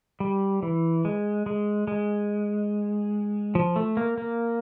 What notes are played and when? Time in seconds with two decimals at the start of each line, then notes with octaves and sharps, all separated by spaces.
0.20 G3
0.63 E3
1.05 G#3
1.46 G#3
1.88 G#3
3.55 F3
3.76 A3
3.97 A#3
4.18 A#3